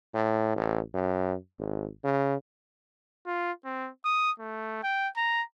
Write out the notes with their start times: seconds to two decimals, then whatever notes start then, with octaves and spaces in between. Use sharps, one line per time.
0.14 A2
0.56 A1
0.94 F#2
1.58 G#1
2.04 C#3
3.26 F4
3.65 C4
4.05 D#6
4.39 A3
4.83 G5
5.17 A#5